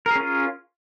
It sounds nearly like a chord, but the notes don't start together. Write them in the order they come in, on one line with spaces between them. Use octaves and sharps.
A#4 G#4 C#4 F4